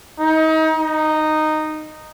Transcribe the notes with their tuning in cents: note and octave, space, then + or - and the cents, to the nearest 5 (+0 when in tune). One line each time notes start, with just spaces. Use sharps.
D#4 +30
D#4 -10